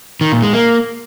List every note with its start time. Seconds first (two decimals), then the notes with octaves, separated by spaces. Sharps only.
0.21 D#3
0.32 A#2
0.42 G#3
0.53 A#3